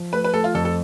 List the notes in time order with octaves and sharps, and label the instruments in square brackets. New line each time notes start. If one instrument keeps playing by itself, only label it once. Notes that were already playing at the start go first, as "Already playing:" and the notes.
Already playing: [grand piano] F3
[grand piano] A3 [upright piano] B4
[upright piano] B4
[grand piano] A3 [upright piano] A4
[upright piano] F4
[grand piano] F2 [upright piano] A4
[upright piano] A4